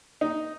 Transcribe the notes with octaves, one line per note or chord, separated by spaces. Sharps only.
D#4